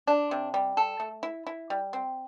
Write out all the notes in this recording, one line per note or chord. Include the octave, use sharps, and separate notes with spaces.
D4
C3
G3
A4
A3
E4
E4
G3
C4